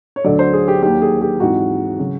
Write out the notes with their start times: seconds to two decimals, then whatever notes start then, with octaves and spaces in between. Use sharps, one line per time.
0.16 C#5
0.24 D2 D3 F#3 D5
0.39 C5
0.53 G#4
0.68 G4
0.82 D#2 D#3 F#3 G4
1.02 G#4
1.22 G4
1.40 G#2 E3 G#3 C4 F#4
1.99 C#3 F#3